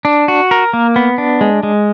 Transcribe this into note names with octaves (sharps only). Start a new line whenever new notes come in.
D4
F#4
A#4
A#3
B3
D4
G#3
G#3